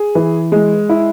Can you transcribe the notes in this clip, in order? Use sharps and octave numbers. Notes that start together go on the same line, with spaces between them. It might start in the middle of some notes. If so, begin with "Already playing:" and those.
Already playing: G#4
E3
G#3
E4